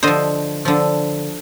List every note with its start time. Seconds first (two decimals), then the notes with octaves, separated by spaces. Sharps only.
0.03 D3 F3 C5 D#5
0.65 D3 F3